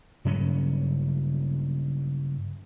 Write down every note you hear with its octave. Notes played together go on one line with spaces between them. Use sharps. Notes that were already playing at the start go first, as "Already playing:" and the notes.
G2 C#3 F#3 C#4